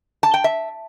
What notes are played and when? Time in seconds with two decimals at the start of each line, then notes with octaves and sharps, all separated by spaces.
0.23 A5
0.34 G5
0.44 E5